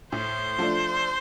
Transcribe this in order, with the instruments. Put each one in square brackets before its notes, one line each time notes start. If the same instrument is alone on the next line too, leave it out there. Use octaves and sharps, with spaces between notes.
[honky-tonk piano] A2 [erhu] C5
[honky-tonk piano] F3 A3 D4